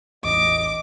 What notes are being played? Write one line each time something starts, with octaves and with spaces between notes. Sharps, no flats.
A1 E2 D#5 D6